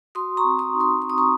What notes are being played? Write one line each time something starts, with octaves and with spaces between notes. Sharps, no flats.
F#4 C6 D#6
A#5 C#6
C4
C6 D#6
D#4
C6 D#6
C4 C#6
D#6
A#5 C#6